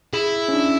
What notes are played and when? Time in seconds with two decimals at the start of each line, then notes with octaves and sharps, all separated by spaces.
0.13 E4 G#4
0.48 C#4
0.53 D4